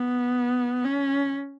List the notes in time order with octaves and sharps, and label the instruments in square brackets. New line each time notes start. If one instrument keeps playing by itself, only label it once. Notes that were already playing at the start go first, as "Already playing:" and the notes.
Already playing: [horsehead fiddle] B3
C#4